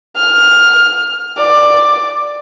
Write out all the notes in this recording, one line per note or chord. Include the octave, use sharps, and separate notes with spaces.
F6
D5